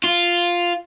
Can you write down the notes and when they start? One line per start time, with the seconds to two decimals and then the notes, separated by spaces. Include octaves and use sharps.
0.04 F4